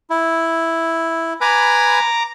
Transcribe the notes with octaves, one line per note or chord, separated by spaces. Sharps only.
E4
B4 G#5 A#5 B5 D6